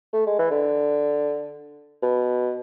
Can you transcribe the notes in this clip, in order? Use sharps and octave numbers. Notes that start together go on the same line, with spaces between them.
A3
G#3
E3
D3
B2